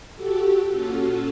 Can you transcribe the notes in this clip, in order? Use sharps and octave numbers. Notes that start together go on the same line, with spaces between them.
F#4 G4 A4
A#2 C#4 F4 F#4 A4